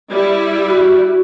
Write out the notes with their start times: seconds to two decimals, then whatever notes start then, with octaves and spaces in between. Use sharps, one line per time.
0.11 G3 E4
0.69 F#4